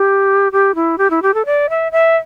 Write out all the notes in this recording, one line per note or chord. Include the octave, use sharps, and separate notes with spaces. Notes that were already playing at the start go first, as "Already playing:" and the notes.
Already playing: G4
G4
E4
G4
E4
G4
A4
D5
E5
E5